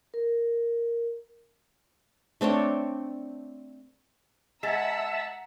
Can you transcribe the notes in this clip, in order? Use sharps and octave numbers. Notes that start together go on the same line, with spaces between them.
A#4
A3 C4 D4 C#5
G#3 E5 F#5 A5 A#5 E6